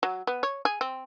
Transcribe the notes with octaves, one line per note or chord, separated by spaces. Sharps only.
F#3
B3
C#5
G#4
C4